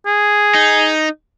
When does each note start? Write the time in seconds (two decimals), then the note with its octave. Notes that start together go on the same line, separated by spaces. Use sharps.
0.06 G#4
0.54 D#4